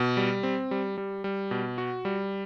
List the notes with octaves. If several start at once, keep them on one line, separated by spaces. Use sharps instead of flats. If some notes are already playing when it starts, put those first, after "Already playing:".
Already playing: B2
G3
C4
G3
G3
G3
B2
F#4
G3